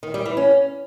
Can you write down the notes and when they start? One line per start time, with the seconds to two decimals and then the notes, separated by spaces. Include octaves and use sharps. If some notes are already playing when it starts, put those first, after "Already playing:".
0.03 D#3
0.14 G3
0.25 E3
0.37 C#4